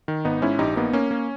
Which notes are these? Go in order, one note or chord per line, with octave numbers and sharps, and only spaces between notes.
D#3
G#1 B3 D#4
G#2 C#4 E4
A#1 D#4 G4
A#3 B3 D#4
A#3 C#4
A#3